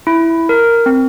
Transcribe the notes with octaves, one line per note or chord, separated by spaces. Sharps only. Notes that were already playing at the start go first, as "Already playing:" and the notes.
E4
A#4
C4